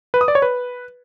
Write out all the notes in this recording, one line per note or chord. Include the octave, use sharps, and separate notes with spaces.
B4
D#6
D5
C#5
B4